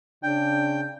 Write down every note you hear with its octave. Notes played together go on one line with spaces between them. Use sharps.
C#3 D4 G5